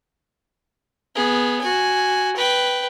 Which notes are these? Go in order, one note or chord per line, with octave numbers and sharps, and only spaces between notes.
B3 G#4
F#4 G#5
B4 G5